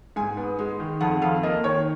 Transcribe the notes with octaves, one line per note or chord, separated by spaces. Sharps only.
G#2 G#5
B3
G#3
D#3
F2 F#5
F2 F5
A#3 D#5
D#3 C#5